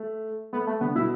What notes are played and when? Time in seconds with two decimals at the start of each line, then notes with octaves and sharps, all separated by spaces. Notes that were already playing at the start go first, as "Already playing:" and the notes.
Already playing: A3
0.53 A3 B3
0.67 A3
0.80 D3 B3
0.95 B2 E4